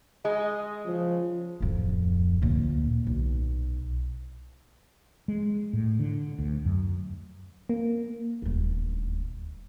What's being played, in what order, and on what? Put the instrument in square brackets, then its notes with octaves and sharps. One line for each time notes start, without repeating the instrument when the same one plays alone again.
[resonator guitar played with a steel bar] G#3 [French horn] D#5
[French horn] C#3 [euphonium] F3
[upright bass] D1 F2
D2 A#2
B1
[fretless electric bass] G#3
A2
D3
D2
F#2
[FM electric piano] A#3
[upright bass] D#1 D2